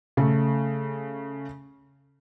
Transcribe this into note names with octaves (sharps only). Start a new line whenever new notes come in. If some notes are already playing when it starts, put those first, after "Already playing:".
C#3 A3